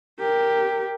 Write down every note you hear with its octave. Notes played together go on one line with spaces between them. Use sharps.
G4 A#4